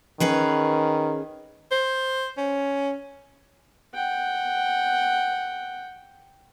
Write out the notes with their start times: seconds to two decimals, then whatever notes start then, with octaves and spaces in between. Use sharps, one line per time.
0.20 D#3 C#4 G#4 B4
1.71 C5
2.37 C#4
3.94 F#5 G5